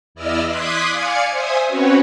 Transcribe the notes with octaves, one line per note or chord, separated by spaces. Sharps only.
E2 E4 D5 D#5 E6 F6
C6 D6 D#6 F#6 G#6 B6
D5 F5 G#5 G#6 C#7
C5 E5 G#5 D#6
C4 C#4 F#4 B4 C#5